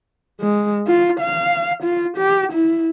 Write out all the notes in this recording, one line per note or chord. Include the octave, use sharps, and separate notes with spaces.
G#3
F4
F5
F4
G4
E4